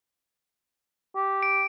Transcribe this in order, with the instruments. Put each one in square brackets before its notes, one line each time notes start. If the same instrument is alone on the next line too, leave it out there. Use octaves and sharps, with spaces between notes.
[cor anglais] G4
[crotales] D7